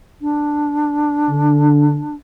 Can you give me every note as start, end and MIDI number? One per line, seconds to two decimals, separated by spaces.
0.21 2.15 62
1.29 2.01 50